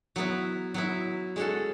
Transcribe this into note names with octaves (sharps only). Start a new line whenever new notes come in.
F#3 B3 E4
F#3 B3 E4
G#3 C#4 F#4 A4